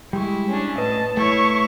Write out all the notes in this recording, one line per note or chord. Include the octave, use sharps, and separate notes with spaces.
G3 G#3 E4 C#6
C#4 D4
A2 B4 D#5 A5
A3 E4 C#5 C#6 E6